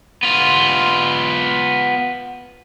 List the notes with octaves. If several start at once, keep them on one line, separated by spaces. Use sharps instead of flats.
B3 F4